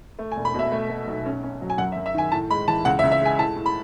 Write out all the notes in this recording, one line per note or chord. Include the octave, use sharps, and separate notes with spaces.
A3
G#5
E1
B5
B2 E5
A3
A3
B1
C#4
C#4
F#3
G#5
F#2 F#5
E5
F#2
E5
D#3 G#5
A2 A5
G#3 B5
E3 A5
C#2 F#5
E5
C#2
E5
G#3 G#5
A2 A5
A2
B5